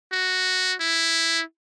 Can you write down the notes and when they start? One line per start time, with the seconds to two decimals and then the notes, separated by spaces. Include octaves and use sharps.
0.12 F#4
0.80 E4